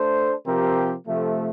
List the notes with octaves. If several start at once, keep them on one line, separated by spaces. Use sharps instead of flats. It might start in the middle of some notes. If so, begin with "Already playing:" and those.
Already playing: A3 D4 A4 C5
C3 F3 C4 G4 A#4
C3 F3 A3